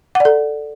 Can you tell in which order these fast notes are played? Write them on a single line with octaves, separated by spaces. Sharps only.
F#5 D5 A4